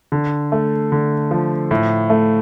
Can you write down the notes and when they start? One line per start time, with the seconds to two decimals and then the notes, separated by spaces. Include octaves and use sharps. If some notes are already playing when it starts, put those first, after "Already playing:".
0.12 D3
0.52 A3
0.92 D3
1.31 F3
1.71 A2
2.10 A3